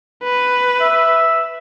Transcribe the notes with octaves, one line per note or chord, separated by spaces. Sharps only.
B4
E5